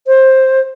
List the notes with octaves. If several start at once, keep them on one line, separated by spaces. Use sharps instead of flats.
C5